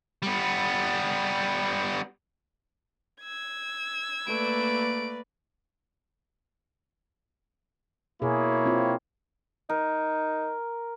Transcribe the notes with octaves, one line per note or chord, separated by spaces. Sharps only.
G3 B3
E6 G#6
A3 A#3 B4 D5 D7
B2 A#3 E4 G#4 C#5
C4 F4
D#4 A#4